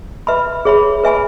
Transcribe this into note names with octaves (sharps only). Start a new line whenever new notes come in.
B4 E5 B5
G#4 C#5 E5 B5
B4 E5 G#5 B5